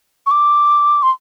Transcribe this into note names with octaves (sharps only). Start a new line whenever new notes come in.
C#6
D6
C6